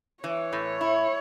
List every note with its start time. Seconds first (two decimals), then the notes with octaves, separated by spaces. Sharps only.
0.24 E3 C#5
0.53 A2
0.81 E4